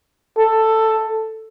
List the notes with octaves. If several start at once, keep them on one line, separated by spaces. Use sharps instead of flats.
A4